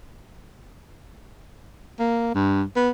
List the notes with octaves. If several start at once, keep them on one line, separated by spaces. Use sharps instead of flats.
A#3
G2
B3